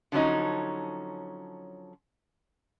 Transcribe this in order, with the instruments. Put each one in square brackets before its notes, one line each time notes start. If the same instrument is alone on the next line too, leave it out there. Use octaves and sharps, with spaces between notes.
[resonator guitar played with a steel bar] D3 F3 F#3 C#4 D#4